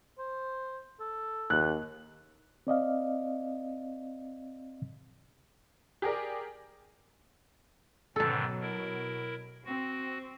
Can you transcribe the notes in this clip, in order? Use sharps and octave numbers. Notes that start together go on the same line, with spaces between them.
C5
A4
D#2 F#6
C4 D5 D#5 F5
G4 G#4 A#4 D5
G#2 B2 D3 D#3 F#3 A4 A5
E4 A#4
C4 F#4